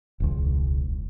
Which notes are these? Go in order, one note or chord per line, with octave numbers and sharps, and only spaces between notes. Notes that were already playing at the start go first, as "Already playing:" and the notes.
E1 C#2